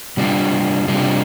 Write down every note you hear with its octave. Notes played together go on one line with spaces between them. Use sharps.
C3 G3 D4 F4
C3 G3 D4 F4